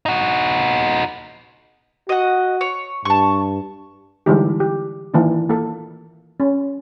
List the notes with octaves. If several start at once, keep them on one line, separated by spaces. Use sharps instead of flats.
D#4 F#4
F#4 D#5 F#5
C#5
G2 A5 C#6
D3 E3 G3 G#3 D#4 G4
G4
D#3 E3 A#3 D4
A#3 A4
C#4